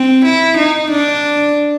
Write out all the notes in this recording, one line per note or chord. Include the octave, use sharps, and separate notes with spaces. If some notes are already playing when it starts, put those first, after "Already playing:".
Already playing: C4
E4
D#4
D4